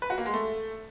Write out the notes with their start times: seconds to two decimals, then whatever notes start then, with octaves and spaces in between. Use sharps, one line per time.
0.02 B4
0.10 F#4
0.18 A#3
0.26 G#3
0.34 A3